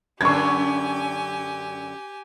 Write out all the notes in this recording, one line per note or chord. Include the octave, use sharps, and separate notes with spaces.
F#2 D3 G4 G#5 C#6 G#6